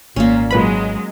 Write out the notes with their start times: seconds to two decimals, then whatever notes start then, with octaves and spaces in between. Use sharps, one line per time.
0.16 G#1 A#2 A#3 C#4
0.51 A#2 F#3 G#3 B4 B5